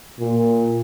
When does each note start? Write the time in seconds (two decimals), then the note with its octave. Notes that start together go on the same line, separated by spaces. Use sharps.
0.19 A#2